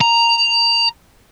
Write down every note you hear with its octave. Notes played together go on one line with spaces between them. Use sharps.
A#5